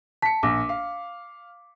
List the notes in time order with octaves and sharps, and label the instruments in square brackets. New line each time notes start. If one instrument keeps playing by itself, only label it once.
[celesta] A5 [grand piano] B6 C#7
[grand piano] A#1 [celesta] D6
[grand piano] F5